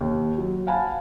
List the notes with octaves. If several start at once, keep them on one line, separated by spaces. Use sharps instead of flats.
D#2
F#3
F5 F#5 G#5 A5 B5